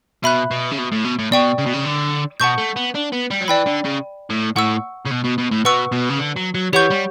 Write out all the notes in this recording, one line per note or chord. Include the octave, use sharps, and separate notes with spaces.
B2 E5 B5 F#6
B2
C#3
B2
A2
B2
A2
B2 D5 G5 C#6
C#3
B2
C#3
D3
B2 F#5 A5 C#6 G6
A3
B3
D4
B3
G3
F#3
E3 D5 G5 B5
D3
C#3
A2
A2 F#5 C#6 E6
C#3
B2
B2
B2
A2
B2 B4 F#5 C#6 E6
B2
C#3
D3
F#3
F#3
E3 G4 C#5 F#5 C#6 G6
G3